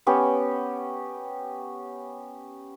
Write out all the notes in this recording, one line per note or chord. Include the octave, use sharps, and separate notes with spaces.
B3 C#4 G4